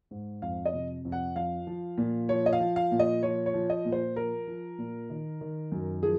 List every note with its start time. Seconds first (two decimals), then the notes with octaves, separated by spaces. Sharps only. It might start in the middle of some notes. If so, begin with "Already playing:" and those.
0.11 G#2
0.42 F2 F5
0.66 D#5
0.73 C3
1.05 F2
1.12 F#5
1.36 F3 F5
1.67 F3
1.98 A#2
2.29 F3 C#5
2.46 D#5
2.53 F5
2.60 F3
2.76 F5
2.92 A#2
2.99 D#5
3.23 F3 C#5
3.46 C#5
3.54 F3
3.70 D#5
3.85 A#2
3.92 C5
4.16 F3 A#4
4.47 F3
4.78 A#2
5.10 D#3
5.41 D#3
5.72 F#2
6.03 F3 G#4